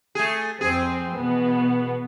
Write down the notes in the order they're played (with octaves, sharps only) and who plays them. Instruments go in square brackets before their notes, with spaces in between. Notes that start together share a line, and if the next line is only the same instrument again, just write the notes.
[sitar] A3 G#4
[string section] F2 C4 [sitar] G#4
[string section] B2 E3 B3